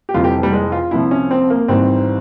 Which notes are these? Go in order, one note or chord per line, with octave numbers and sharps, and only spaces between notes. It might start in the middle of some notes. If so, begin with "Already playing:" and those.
G4
F1 F2 E3 G3 F4
G4
G3
G#3
F4
C2 C3 F3 E4
C#4
C4
A#3
G#1 G#2 E3 G3 C4